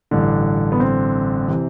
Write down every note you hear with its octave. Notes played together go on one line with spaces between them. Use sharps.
A1 G2 D3
B3
C4
C3 E3